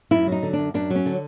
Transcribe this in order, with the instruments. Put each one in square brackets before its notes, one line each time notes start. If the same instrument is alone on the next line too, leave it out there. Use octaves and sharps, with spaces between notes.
[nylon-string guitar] F#2 E4
F#3 D#4
D3
D4
F#2
F#2 D4
F#3
C#4
D3